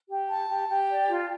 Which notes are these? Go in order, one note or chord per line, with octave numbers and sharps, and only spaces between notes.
G4
A5
G4
G4
D5
F4